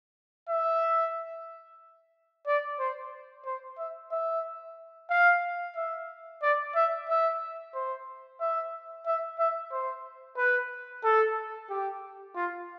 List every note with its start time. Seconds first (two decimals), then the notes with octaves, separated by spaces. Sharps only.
0.49 E5
2.47 D5
2.79 C5
3.45 C5
3.78 E5
4.11 E5
5.10 F5
5.76 E5
6.42 D5
6.75 E5
7.08 E5
7.74 C5
8.40 E5
9.06 E5
9.38 E5
9.72 C5
10.37 B4
11.04 A4
11.70 G4
12.36 F4